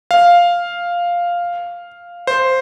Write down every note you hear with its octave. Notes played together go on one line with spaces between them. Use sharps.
F5
C5